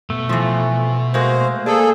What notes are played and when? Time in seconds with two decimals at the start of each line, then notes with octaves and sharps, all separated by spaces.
0.10 B2 A3
0.29 E3 F3
1.14 G#3 A#3 F#4 C5
1.66 A#3 G#4 A4 D5